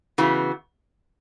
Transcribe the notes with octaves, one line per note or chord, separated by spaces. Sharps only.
C#3 E3 B3 F#4